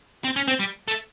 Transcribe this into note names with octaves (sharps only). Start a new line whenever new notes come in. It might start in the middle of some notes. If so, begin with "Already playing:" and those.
C4
C#4
C4
G3
A3